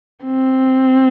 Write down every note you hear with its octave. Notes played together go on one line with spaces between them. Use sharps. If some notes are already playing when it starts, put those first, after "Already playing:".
C4